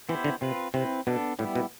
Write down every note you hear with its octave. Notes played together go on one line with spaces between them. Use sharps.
E3 B3 E4 G4 C5
D3
C3 C4 F4 B4
C3 C4 E4 B4
B2 B3 D4 A4
A2 G3 B3 E4
B2